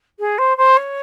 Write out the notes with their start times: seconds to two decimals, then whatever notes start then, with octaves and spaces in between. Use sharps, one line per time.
0.19 G#4
0.38 C5
0.57 C5
0.76 C#5